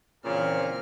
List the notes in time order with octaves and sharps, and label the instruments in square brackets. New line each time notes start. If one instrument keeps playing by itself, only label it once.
[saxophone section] A#2 C#3 [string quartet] E3 C4 F6